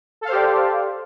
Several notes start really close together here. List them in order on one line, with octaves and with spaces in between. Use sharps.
A4 F5 C5 G4 D5